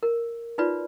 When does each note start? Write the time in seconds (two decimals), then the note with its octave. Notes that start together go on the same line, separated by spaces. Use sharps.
0.03 A#4
0.58 D#4 F4 F#4 B4 D5